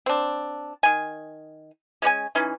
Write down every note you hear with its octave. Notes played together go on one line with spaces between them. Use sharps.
C4 D4
D#3 G#5
G#3 C#4 D5 G#5
E3 C#4 D#4